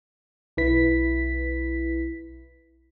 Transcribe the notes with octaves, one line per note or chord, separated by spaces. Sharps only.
B1 E4 B4 B6